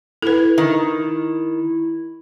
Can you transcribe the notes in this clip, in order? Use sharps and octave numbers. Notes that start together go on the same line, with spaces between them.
E4 A4 B4
D#3